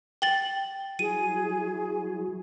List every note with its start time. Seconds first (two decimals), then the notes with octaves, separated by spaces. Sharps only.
0.22 G5 A6 F#7 G7
0.99 F#3 E4 F#4 G#4 D#7